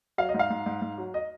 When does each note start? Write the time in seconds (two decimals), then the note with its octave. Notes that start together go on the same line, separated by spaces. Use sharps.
0.18 F#3 F5
0.29 D#5
0.34 G#2
0.39 F5
0.50 G#2
0.66 G#2
0.82 G#2
0.98 F#3
1.14 D#5